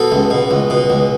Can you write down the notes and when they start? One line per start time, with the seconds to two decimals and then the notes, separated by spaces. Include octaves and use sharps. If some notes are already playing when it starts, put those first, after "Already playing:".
Already playing: B2 A4
0.12 C#2
0.31 B2
0.51 C#2
0.70 B2
0.90 C#2